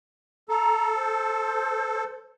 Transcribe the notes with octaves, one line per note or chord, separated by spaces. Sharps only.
A4 A#5
C5